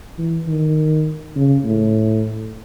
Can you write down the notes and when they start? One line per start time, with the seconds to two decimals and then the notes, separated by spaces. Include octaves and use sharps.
0.18 E3
0.48 D#3
1.36 C#3
1.64 A2